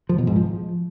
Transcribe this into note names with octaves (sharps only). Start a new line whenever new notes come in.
F3
B2
G#2
F3